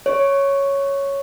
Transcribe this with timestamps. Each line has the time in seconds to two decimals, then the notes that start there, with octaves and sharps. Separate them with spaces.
0.06 C#5